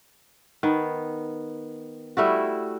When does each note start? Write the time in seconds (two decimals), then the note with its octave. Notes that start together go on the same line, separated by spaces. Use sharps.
0.63 D#3 B3
2.17 G3 A3 E4 F#4